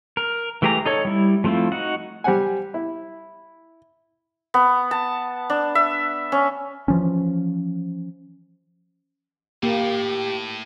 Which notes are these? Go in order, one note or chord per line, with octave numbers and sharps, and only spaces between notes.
A#4
E3 A3 G4 G#4 A#5
D#4 A4 C#5
G3 E4
F3 A3 C4 E4 F4
D#4 F#4 F#5
G3 G4 C5 F#5 G#5
E4
B3
A5
D4
E5
C#4
E3 F3 C#4
A2 A#3 G4